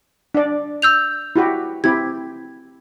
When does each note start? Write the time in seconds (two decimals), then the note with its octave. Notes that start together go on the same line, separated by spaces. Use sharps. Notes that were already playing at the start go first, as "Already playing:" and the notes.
0.35 D4 D5
0.82 E6 G6 F7
1.36 E4 F#4 G4
1.84 C4 E4 G4 G#6